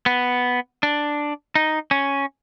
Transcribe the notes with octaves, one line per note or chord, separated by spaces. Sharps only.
B3
D4
D#4
C#4